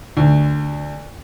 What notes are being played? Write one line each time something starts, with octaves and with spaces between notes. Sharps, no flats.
D2